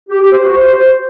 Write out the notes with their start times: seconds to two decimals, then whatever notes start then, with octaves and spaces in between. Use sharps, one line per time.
0.09 G4
0.21 G4
0.33 C5
0.45 F#4
0.56 C5